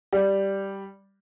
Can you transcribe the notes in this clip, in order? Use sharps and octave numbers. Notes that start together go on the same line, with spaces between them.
G3